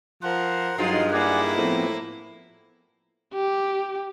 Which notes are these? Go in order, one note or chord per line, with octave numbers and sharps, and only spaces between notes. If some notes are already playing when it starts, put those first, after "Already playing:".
F3 A#4 C5 F#5
G2 F#3 G#3 D#4 F4 C6
A#3 E4 D5 F#5 G#5
A2 F3 B3 C4
G4